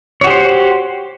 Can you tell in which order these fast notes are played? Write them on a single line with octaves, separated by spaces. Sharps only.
C#5 F#4 G4 C5